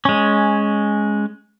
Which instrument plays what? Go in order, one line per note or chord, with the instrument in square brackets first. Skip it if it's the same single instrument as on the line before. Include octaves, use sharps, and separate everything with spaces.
[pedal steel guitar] G#3 C#4